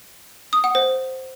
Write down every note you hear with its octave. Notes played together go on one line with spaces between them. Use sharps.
D#6
F#5
C5